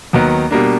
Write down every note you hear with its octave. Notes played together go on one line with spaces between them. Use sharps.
D#2 D#3 F#3 B3
B2 G3 A#3 D4